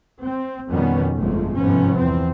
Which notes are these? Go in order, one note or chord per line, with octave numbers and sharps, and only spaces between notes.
C4
F2 B2 D#3 G3 B3 C#4
G1 F2 F3 G#3 A3
G1 G#2 C3 F3 B3 C#4
E2 C4